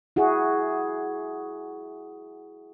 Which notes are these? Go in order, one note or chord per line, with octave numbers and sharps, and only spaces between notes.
E4 F#4 G#4